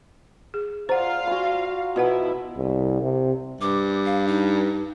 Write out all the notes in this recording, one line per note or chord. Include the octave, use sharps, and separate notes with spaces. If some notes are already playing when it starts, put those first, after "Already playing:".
G#4
F4 C5 D5 F5 F#5 A#5
F#4 G#5 C6
B2 F3 E4 F#4 B4 F#5
C2
C3
G2 D6
F5
D#4